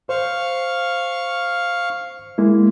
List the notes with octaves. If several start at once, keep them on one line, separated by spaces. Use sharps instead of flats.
C5 F5 C#6
G#3 A#3 E4